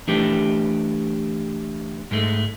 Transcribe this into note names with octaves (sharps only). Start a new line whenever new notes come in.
E3 A3 D4 G4
G#2 G#3 A3